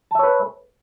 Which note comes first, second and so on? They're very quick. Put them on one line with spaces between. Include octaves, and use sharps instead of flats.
A5 E5 C#5 B4